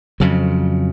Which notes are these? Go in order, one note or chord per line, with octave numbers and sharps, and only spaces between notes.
F2 C#3 F#3